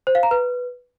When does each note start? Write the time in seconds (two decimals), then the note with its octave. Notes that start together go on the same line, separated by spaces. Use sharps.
0.07 C5
0.15 F5
0.23 A#5
0.31 B4